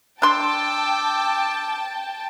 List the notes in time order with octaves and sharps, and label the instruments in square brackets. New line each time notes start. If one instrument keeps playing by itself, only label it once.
[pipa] D4 C6 [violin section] G5 A5 [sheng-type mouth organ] D6 E6